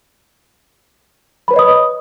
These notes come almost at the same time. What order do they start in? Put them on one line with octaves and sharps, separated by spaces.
B5 B4 C#5 D#5 D#6